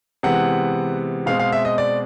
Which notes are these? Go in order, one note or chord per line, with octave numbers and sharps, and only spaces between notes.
C3 E3 G#3 B3 F#5
B2 G#3 C4 F5
F5
E5
D#5
D5